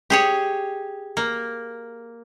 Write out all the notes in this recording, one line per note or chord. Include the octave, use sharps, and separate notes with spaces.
G4 G#4 C#5
A#3